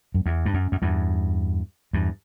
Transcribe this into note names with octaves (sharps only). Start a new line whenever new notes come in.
F#2
E2
G2
F#2
F#2
E2 G2
E2 G2